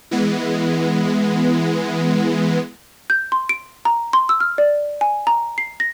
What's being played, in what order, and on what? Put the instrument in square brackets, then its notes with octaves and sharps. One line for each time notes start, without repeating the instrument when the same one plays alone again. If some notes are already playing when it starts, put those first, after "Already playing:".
[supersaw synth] E3 G#3 B3
[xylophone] G6
C6
D7
A#5
C6
E6
F6
D5
G#5
A#5
C7
A#6